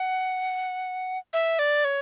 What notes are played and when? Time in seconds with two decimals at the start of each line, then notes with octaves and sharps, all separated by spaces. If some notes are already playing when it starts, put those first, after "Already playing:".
Already playing: F#5
1.33 E5
1.59 D5
1.85 C#5